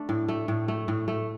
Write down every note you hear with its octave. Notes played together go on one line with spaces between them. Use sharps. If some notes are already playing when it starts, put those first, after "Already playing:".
Already playing: A3 D4
A2
A3
A2
A3
A2
A3